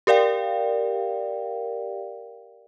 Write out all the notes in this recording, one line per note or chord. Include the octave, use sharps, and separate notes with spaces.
G4 A#4 D5 F5 G5